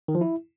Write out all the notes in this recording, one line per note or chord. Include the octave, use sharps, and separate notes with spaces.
D#3
F3
E4